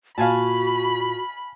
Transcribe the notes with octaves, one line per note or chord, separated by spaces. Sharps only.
A#2 F#4 F5 G#5 A5 B5